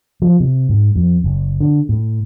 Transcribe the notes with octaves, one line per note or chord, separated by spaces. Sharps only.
F3
C3
G#2
F2
F#1
D3
A2